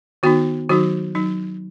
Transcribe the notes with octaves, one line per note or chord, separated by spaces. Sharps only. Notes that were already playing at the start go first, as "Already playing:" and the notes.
D#3 B3 D#4 F#4
D#3 F#3 D#4 F#4
F#3 D#4